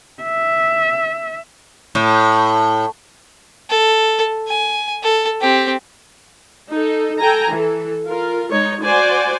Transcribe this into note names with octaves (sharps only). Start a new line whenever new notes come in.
E5
A2
A4
G#5
A4
C4 G4
D#4 A4
A4 G5 G#5 A#5
E3 A4
F4 A#4
G#3 D#4 C#5
F#4 C5 D5 G#5